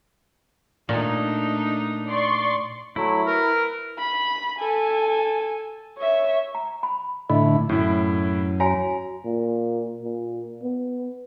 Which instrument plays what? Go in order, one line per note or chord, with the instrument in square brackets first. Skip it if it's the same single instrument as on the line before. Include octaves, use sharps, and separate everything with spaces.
[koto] A#2 [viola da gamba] A3 D4 D#4
[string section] D5 C6 C#6
[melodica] F#3 A3 [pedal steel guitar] E4
[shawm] A#4 [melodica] B4
[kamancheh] B5
A4 G#5
C#5 E5
[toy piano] A#5
B5
[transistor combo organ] A2 D3 E4 [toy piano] D#5 B5
[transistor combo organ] F#2 [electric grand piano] A2 E4
[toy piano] F#4 C#5 G#5 [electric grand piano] A#5
[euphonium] A#2
A#2
B3